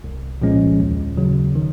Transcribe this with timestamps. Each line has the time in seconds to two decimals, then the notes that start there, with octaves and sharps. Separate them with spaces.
0.04 C2
0.42 A#2 F3 G#3 C#4
0.80 D#2
1.17 C#3 F#3
1.55 D#3